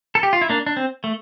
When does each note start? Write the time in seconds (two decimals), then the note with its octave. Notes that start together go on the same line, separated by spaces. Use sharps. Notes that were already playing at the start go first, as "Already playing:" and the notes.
0.15 A4
0.23 G4
0.33 F4
0.41 E4
0.49 A#3 D4
0.66 D4
0.77 C4
1.04 A3